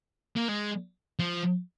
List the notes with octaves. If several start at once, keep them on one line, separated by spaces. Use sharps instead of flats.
A#3
G#3
F3